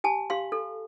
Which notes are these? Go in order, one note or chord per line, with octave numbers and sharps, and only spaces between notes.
G4 G#5 A5
G4 F5 C6
A4